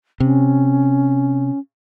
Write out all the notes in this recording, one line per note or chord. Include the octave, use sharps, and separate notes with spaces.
C3 C#4